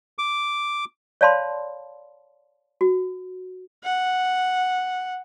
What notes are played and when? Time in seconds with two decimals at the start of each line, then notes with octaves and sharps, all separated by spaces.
0.18 D6
1.21 C#5 D5 F5 A5 B5 C6
2.81 F#4
3.84 F#5